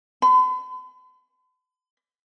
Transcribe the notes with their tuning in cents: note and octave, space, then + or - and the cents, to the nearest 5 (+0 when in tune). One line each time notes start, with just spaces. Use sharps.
B5 +45